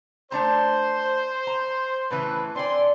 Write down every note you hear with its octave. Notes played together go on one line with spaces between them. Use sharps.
A3 D4 C5 A#5
A#5
A2 C#3 E3 B4
C4 D4 D5 G#5 C6